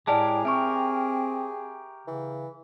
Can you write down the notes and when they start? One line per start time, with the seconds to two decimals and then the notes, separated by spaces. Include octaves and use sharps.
0.07 A2 G#3 G4 G#4 A#4 D5 A5
0.45 C4 G4 A#4 E5 C#6
2.07 C#3 E3